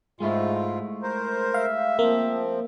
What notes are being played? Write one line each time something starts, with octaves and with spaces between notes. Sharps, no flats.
G#2 G#3 A3 E4 F4
A#4 C5
E5 F5
F3 A#3 C4